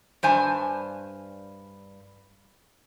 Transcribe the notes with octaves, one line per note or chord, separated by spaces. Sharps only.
G2 C5 G#5 A5